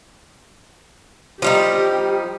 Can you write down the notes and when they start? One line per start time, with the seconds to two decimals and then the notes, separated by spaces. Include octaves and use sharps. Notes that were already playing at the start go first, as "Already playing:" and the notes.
1.42 F3 G3 D#4 G4